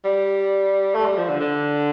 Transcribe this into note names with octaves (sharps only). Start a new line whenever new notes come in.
G3
A3
G3
F3
D3
D3